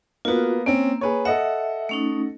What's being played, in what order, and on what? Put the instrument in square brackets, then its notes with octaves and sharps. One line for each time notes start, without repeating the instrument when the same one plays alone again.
[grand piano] A#3 B3 [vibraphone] F4 F#4
[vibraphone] A#3 [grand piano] C4 C#4
[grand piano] G#4 B4 C#5
[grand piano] A4 D#5 F#5 [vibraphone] E5
[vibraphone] A3 C#4 D#4